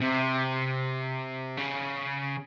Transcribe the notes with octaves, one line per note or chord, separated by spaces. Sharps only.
C3
C#3